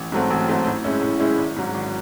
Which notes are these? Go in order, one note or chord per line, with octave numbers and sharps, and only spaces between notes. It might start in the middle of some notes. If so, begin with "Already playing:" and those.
Already playing: A1
G#2 F#3 A3 C4
A1
G#2 F#3 A3 C4
A2
G#3 C#4 E4
A2
G#3 C#4 E4
G#1
G#2 F#3
G#1